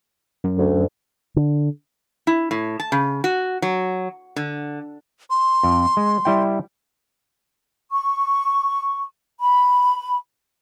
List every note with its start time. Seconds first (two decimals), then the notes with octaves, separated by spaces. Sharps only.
0.44 F#2
0.58 D2
1.36 D3
2.27 E4
2.51 A2
2.80 A5
2.92 C#3
3.24 F#4
3.62 F#3
4.36 D3
5.30 C6
5.63 F2
5.97 G#3
6.25 G3 E4 G5
7.91 C#6
9.40 B5